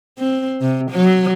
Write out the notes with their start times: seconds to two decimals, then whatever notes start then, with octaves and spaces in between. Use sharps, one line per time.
0.19 C4
0.61 C3
0.92 F#3